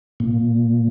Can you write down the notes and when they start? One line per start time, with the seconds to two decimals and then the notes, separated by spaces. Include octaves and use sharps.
0.20 A#2